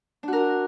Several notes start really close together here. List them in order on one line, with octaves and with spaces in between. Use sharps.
D4 F#4 A#4